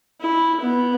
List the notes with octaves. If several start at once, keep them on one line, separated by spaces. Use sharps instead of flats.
E4
B3